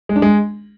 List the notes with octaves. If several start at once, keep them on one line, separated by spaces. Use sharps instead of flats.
G#3
D4
G#3